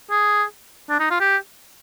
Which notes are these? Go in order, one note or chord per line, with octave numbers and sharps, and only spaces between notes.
G#4
D4
D#4
F4
G4